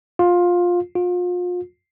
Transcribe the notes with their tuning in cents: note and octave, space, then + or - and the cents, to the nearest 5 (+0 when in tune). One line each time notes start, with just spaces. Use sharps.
F4 +15
F4 +35